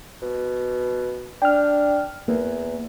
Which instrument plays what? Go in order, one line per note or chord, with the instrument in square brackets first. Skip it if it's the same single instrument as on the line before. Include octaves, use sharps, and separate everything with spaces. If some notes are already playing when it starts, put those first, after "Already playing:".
[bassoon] B2
[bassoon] D4 [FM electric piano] G5 F6
[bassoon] E2 [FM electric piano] A#3